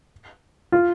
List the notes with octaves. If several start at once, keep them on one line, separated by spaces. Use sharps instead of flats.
F4